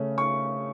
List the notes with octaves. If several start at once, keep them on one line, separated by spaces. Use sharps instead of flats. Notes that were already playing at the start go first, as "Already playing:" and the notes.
Already playing: C#3 A3 C#4
C#6